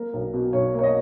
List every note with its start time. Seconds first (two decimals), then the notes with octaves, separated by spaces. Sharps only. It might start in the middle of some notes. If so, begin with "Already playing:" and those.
Already playing: A#3 A#4
0.13 B1
0.34 B2
0.53 B1 C#5
0.74 A#3
0.79 C#5
0.83 D#5